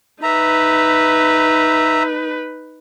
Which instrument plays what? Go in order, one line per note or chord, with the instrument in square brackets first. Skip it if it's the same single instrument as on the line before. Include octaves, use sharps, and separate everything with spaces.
[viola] D#4 B4 [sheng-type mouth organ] E5 A#5